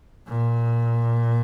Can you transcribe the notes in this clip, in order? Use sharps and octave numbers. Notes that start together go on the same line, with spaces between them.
A#2